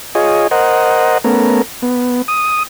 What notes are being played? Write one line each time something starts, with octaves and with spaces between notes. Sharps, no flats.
F4 G#4 C#5 D#5
A#4 C5 D#5 F#5
A3 B3 C#4 A#4
B3
D#6